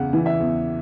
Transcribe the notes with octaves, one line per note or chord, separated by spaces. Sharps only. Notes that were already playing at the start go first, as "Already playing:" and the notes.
Already playing: E2 C#3 F#5
E3
E5
E2